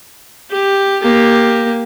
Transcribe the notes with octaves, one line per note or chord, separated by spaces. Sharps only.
G4
A#3 G4